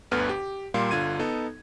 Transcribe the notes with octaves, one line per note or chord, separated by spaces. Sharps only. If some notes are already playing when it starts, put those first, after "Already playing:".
G1 D2 D3 B3 B4 F6
G4
A#2 G3 A#3 F5 C6
G1 D3 F4 G#6 D#7
B3 D#4 A4